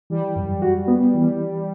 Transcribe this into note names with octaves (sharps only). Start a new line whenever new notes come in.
E3 G3
F#2
F#4
B3
E3